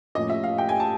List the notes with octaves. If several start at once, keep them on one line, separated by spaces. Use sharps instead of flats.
A2 F3 A#3 C#4 D#5
E5
F5
G5
G#5
A5